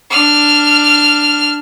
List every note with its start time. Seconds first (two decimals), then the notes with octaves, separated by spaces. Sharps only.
0.11 D4 F6